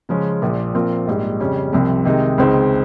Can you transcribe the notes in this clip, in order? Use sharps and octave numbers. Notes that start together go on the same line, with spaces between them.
C#3 F3 G#3 C#4
A#1 A#2 F3
A#2 F3 C4 F4 A#4
A#1 G#2 G3
F2 C#3 G3 C#4
C2 C3 F3
C3 D#3 G#3 D#4
C#2 C#3 G#3 C4 D#4